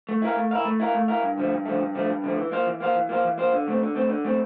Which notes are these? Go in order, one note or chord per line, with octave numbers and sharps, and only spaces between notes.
A3
E4 A#4 F5
A3
E4 A#4 F5
A3
E4 A#4 F5
A3
E4 A#4 F5
G2
D3 F3 A3
G2
D3 F3 A3
G2
D3 F3 A3
G2
D3 F3 A3
E3
A#3 F4 C5 F5
E3
A#3 F4 C5 F5
E3
A#3 F4 C5 F5
E3
A#3 F4 C5 F5
D3
A3 C4
D3
A3 C4
D3
A3 C4